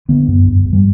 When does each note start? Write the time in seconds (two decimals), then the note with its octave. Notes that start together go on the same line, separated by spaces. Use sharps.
0.09 D3 B3
0.28 F#2
0.47 G2
0.65 G2
0.73 G3